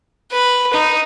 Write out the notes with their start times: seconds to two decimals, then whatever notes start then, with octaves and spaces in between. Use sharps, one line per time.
0.32 B4
0.73 D#4